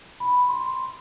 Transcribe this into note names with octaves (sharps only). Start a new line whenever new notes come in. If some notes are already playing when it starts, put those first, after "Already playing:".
B5
C6